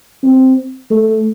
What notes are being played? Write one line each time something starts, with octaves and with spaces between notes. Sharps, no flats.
C4
A3